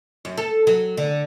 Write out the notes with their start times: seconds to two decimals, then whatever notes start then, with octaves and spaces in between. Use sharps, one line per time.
0.25 F#2
0.37 A4
0.67 F#3
0.97 D3